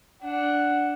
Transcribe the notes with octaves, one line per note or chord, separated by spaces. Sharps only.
D4 F#5